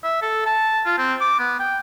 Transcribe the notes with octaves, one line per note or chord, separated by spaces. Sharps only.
E5
A4
A5
F4
C4
D6
B3
G5